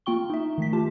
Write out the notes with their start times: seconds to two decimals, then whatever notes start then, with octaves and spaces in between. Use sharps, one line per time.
0.06 A#3 F4 G5 C#6 G7
0.30 D#4 E5
0.58 D#3 A3 B6
0.73 F4 G4 A5